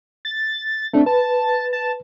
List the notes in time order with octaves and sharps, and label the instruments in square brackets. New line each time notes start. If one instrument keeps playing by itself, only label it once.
[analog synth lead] A6
[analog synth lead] A3 [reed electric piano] C4 D4
[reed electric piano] B4 [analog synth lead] A5
[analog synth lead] A5